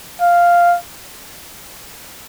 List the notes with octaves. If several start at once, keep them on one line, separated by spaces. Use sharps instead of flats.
F5